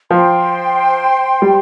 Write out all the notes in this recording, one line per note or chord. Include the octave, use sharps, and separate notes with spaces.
F3 C5 G5 C6
G3